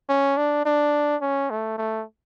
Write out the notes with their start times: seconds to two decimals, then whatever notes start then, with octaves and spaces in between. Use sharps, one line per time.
0.09 C#4
0.37 D4
0.65 D4
1.22 C#4
1.50 A3
1.78 A3